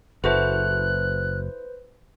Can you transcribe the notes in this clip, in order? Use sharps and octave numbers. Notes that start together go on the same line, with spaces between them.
F#1 E4 F#4 A4 B4 C5 F#6